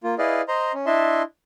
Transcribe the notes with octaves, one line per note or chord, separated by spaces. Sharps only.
A#3 F4
E4 G#4 B4 D5 D#5 F5
C5 D#5 A#5 C6
C#4
D4 E4 D#5 E5 A5 C6